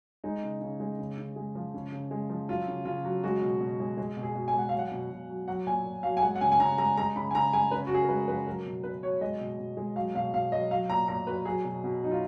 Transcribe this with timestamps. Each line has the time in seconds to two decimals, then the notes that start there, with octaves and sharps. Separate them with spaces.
0.24 G#3 D#4
0.43 C#3
0.61 C#3
0.80 G#3
0.99 C#3
1.18 C#3
1.36 G#3
1.55 F3
1.74 C#3
1.92 C#3
2.11 G#3
2.29 F3
2.48 F#3 F4
2.68 C#3
2.85 C#3 F4
3.05 F#3
3.24 G#3 F#4
3.42 B2
3.61 B2
3.80 G#3
3.97 G#3
4.17 B2
4.23 G#4
4.35 B2
4.48 G#5
4.54 G#3 F#5
4.69 F#3 F5
4.79 F#5
4.91 B2
5.10 B2
5.29 F#3
5.48 F#3 F#5
5.67 A#2 G#5
5.85 A#2
6.03 F#3 F5
6.17 G#5
6.22 G#3 F#5
6.36 F#5
6.41 C#3 G#5
6.52 G#5
6.59 C#3 A#5
6.78 G#3 A#5
6.97 G#3 A#5
7.15 C#3 B5
7.31 G#5
7.35 C#3 A#5
7.53 G#3 G#5
7.71 C#3 B4
7.87 F#4
7.91 C#3 G#4
8.02 A#4
8.09 G#3 B4
8.28 F3 B4
8.47 F#3 A#4
8.66 B2
8.83 B2 B4
9.03 F#3 C#5
9.21 G#3 D#5
9.41 B2
9.59 B2
9.77 G#3
9.96 F#3 F5
10.15 B2 F5
10.33 B2 F5
10.52 F#3 D#5
10.71 F#3 F5
10.90 A#2 A#5
11.08 A#2 A#5
11.27 F#3 B4
11.45 F#3 G#4
11.65 B2
11.84 B2
12.02 F#3 D#4
12.11 F4